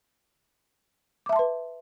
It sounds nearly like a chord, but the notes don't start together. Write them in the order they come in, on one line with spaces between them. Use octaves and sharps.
D6 E5 A5 C6 B4